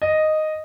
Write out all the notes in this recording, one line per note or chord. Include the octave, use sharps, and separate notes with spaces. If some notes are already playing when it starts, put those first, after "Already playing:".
D#5